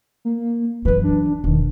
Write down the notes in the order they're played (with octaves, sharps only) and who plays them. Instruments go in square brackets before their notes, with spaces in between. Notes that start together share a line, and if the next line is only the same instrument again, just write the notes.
[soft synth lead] A#3
[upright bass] F#2 E3 [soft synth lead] B4
[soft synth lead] D4
[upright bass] E1 [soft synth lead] D#3